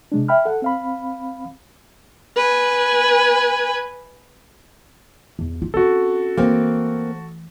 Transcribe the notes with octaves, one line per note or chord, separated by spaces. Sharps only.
C3 G#3 D4
E5 G5 B5 F6
A4 F#5
C4 F5 B5
B4 G#5
E2
F4
C4 C#4 F#4 A4
E3 A3 A#3 C4